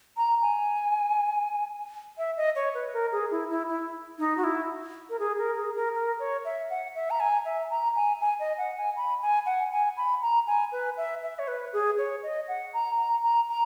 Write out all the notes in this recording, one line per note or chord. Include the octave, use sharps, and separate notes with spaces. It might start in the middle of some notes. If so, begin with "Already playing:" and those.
A#5
G#5
E5
D#5
C#5
B4
A#4
G#4
E4
E4
E4
D#4
F#4
E4
A#4
G#4
A#4
G#4
A#4
A#4
C#5
E5
F#5
E5
A#5
G#5
E5
A#5
G#5
G#5
D#5
F#5
G#5
B5
G#5
F#5
G#5
B5
A#5
G#5
B4
E5
E5
C#5
B4
G#4
C#5
D#5
F#5
A#5
A#5
A#5
A#5